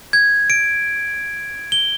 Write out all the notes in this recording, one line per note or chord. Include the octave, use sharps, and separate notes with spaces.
G#6
D7
G7